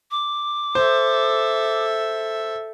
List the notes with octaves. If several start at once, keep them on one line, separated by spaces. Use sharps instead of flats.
D6
A4 C5 E5